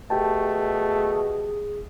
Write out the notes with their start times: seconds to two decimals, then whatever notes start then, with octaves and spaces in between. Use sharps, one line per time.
0.10 B2 A3 G4 G#4 G5 A5